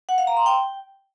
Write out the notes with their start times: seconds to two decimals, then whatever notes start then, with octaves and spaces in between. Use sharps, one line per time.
0.09 F#5
0.18 F5
0.27 A#5
0.37 C6
0.46 G5